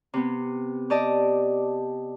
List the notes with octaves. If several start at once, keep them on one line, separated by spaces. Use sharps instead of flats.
C3 B3
G4 D5 D#5 A5